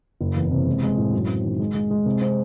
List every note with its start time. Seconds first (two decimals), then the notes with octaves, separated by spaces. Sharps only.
0.21 F#1
0.36 E2
0.51 C3
0.67 G#3
0.83 G#3
0.97 A2
1.13 F#2
1.28 C4
1.44 D#3
1.59 G#3
1.75 G#3
1.90 G#3
2.06 C3
2.21 C4